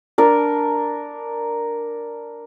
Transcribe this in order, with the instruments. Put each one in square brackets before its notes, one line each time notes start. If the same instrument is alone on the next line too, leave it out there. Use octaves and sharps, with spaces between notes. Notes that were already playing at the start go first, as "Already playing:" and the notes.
[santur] D4 A#4